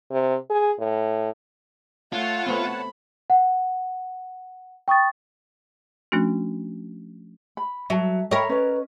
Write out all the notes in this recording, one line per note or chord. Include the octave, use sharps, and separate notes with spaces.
C3
G#4
A2
A3 F4 C#5 F#5 A5
A3 B3 C4 B5
F#5
G5 C#6 D#6 A6
F3 A3 C#4 D4 F#4
B5
F#3 E5 A5
A#4 C#5 D#5 E5 G5 B5
C#4 B4 D#5